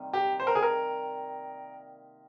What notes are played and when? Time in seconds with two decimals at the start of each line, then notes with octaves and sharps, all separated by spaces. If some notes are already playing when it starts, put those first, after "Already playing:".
Already playing: C3 D#3 G3 A#3
0.13 G4
0.40 C5
0.47 A#4
0.55 G#4
0.63 A#4